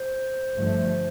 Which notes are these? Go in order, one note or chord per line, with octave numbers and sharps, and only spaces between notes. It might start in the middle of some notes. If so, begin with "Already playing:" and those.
Already playing: C5
G1 G2 D3 F3 A3